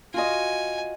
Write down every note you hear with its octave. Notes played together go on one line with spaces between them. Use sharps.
F4 F#4 D#5 G#5